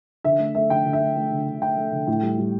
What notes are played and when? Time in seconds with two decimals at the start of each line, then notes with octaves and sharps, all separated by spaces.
0.25 D3 E5
0.39 A3
0.55 A3 E5
0.70 D3 G5
0.86 D3
0.93 E5
1.00 A3
1.16 A3
1.32 D3
1.46 D3
1.62 A3 G5
1.77 A3
1.92 D3
2.07 A2
2.23 G3
2.38 G3